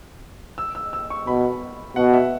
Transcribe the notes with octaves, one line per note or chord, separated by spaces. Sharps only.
E6
E6
E6
C#6
B2 B5
B2 F#5
E5